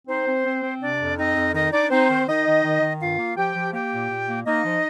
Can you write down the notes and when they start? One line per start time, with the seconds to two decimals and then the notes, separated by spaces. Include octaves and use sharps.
0.08 C4 D#4 C5
0.27 C4
0.45 C4
0.63 C4
0.81 C3 D4 D5
0.99 F2
1.17 C4 D#4 D#5
1.36 F2
1.54 D#3 D#4 D#5
1.72 D4 D#4 D5
1.90 C4 D#4 C5
2.09 D#3
2.27 D#3 D#4 D#5
2.46 D#3
2.64 D#3
2.81 D#3
3.00 G2 F4 F5
3.19 A#3
3.36 F3 G4 G5
3.54 F3
3.73 A#3 G4 G5
3.92 A#2
4.09 A#2
4.28 A#3
4.46 A#3 D#4 D#5
4.65 F3